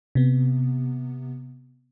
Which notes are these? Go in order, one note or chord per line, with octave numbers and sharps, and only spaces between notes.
C3 B3